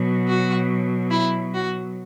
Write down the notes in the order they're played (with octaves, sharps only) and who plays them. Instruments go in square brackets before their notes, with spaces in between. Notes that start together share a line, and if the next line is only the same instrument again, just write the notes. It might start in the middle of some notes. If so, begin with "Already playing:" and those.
Already playing: [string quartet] B2 F#3
F#4
E4
F#4